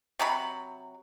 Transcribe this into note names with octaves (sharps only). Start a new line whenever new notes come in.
C3 F#3 B5